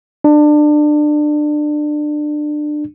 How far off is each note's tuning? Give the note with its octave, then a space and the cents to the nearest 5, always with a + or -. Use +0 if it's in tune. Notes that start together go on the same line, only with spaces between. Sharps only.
D4 +25